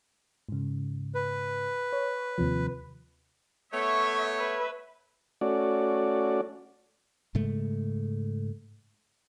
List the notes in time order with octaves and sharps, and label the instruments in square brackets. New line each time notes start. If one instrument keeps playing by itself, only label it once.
[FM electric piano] G#2 C#3
[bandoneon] B4
[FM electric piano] C#5
D#2 C3 F3
[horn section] A3 B3 C#5 [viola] E5 C#6
[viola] B4 E5
[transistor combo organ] A3 C#4 F#4 D5
[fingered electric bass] G#2 C#3 G#3 A3